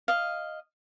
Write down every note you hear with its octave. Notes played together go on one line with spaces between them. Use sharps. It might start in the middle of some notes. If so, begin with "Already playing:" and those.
D#5 F5